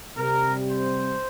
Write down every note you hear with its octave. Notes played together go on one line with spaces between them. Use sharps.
C3 G3 A#4
C5